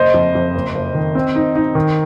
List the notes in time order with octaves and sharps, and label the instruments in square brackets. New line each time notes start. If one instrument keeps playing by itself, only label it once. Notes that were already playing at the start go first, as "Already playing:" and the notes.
Already playing: [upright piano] F#1 C5 D#5
F2
F2
F#1
F#1
D#3
C4
D#4
D#4
D#3